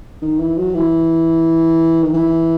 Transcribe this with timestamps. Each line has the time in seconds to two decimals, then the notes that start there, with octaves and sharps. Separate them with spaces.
0.22 D#3
0.39 E3
0.57 F#3
0.74 E3
2.03 D#3
2.13 E3